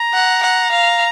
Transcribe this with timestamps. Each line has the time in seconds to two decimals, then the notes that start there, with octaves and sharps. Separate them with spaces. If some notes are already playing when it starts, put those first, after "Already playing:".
Already playing: A#5
0.14 F#5
0.43 F#5
0.72 F5